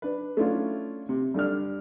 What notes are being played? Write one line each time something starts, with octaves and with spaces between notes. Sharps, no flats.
D4 B4
A3 C#4 D4 E4 F4
C3
G2 D3 D4 F6